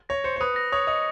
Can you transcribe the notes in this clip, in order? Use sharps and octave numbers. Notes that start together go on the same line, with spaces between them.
C#5 A#6
C5 C#7
C5
B4 D#6
A#6
C#5 D#6
D#5 D#6